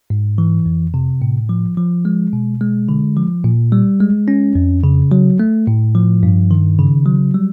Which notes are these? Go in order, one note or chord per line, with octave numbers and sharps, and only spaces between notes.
G#2
E3
F2
C3
A2
F3
F3
G#3
B2
G#3
D3
F3
A#2
G3
G#3
C#4
F2
C#3
F#3
A3
A2
F3
G2
D#3
C#3
F#3
G3